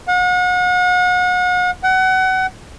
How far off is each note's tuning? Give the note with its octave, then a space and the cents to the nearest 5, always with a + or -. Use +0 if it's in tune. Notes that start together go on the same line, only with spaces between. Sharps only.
F#5 -40
F#5 +25